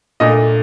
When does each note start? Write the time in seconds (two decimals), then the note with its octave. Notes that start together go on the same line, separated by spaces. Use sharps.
0.20 A#2 A3 D4 D#5